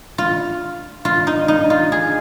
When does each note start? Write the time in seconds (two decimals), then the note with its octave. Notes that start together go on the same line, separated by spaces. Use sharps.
0.18 F4
1.05 F4
1.27 D#4
1.48 D#4
1.70 F4
1.92 G#4